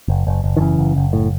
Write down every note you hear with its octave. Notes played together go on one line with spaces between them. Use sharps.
F#1
F#1
F#1
D#3
C#3 E3
F#1
F#1
A2